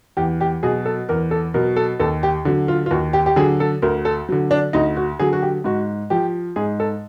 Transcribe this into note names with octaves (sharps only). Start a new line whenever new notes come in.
E2 G4
G4
B2 F#3 G#4
A4
E2 A#4
A4
B2 F#3 A#4
A4
D#2 A4
G4
D3 F#3
F4
F4
D#2 F#4
G4
G4
D3 F#3 G#4
A4
D2 A#4
A4
D3 F#3
D4
D2 D#4
F#4
D3 F#3 G#4
F#4
G4
G#2 F#4
F3 G4
G#2 G#4
A4